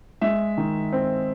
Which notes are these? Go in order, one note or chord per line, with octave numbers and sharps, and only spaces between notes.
G#3 E5
D#3
C4